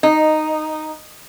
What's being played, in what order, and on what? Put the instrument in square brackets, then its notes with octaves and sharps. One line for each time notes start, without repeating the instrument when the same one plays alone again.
[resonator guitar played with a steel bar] D#4